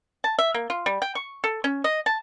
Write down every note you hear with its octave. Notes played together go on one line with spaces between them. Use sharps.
A5
E5
A#3
F4
G3
G5
C#6
A4
C#4
D#5
A5